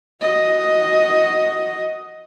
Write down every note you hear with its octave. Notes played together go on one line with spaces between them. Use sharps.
F#4 D#5